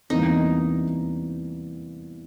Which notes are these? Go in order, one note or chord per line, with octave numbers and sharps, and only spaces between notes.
E2 C3 E3 G3 A#3 D#4